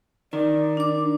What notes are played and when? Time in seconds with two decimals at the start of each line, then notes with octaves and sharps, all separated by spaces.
0.33 D#3 D5
0.77 D4 D6